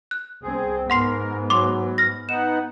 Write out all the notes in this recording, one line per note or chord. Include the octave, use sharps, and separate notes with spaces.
F#6
C2 C4 G#4
G#2 B3 A#4 F#5 C6 C7
F#3 C6 D6
F6 A#6
B3 D#4 F#5 E7